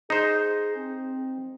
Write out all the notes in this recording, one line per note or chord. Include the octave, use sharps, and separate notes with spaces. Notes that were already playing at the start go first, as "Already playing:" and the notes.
D#4 G#4 C5
C4